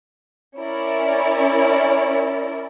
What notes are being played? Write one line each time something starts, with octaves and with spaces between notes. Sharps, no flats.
C#4 E4 A#4 D5